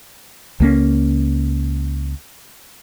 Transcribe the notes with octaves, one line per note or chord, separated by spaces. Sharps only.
C#2 A#3 C#4